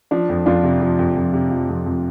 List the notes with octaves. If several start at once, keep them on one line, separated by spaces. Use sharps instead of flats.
F3 D4
F2
F2 D4 F4
C3
F3
F2
F2
C3
F3
F2
F2